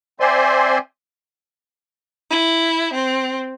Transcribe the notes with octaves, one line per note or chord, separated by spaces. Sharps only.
C4 C5 D5 E5 G#5 C6
E4
C4